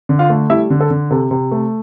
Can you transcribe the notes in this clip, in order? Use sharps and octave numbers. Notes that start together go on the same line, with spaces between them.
D3
F4 F5
A3
G3 E4 E5
D3
A4
D3
C3 A4
C3
A3